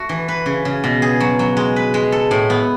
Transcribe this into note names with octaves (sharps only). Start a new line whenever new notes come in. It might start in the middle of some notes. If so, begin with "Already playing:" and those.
Already playing: A3 F#4
E3
B4
C#3
C#3
B2
G#4
F#3
F#3
G#3
B4
G#3
A4
A2
B3